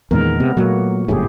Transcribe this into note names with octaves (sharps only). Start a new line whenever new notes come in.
E2 A#2 D#3 G#3 B3 A#4
C3 B3
A#2 F#3 A3 A#3 F#4
G1 F#2 A2 E4 G4 G#4